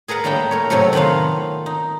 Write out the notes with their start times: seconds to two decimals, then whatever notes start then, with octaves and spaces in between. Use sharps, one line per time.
0.08 G#4 A#4 B4 F#5 A5
0.24 A2 G3 A#3 D4 G5
0.51 A3 A#4 C#5
0.70 A2 C3 F#3 A3
0.93 D#3 A3 B3 F4 F5
1.66 D#4